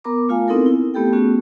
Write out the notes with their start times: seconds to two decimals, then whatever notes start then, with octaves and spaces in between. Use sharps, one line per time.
0.04 B3 A#4 A#5 D6
0.29 A3 F4 F5 G#5
0.48 B3 C4 D#4 E4 A4 A#4
0.66 E4
0.94 A3 B3 G4 A4 G5
1.13 A3 B3 C#4 F#4 G#4